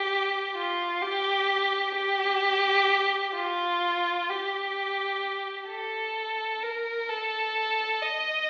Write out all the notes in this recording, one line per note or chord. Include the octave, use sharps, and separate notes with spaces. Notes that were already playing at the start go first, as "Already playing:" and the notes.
Already playing: G4
F4
G4
G4
F4
G4
A4
A#4
A4
D#5